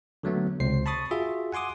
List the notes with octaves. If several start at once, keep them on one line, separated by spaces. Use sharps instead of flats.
D3 F#3 A3 B3
C#2 C3 C5 C7
A5 B5 C#6 D#6 A6
F4 F#4 G#4 E5
F#5 G#5 C6 D6 D#6